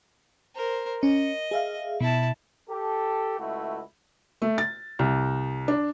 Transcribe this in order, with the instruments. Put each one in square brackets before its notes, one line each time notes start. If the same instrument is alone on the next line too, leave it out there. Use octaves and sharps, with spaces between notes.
[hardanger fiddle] A#4 C5
[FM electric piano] C#4 [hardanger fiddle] D#5
[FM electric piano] G#4 E5 F5
[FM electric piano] B2 [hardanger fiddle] E4 A5
[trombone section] G4 A4
C#2 A3 E4 F#4
[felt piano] A3
A6
C2
D4